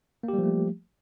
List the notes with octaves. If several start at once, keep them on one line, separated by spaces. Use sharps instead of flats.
F3 G3 A3 A#3 G4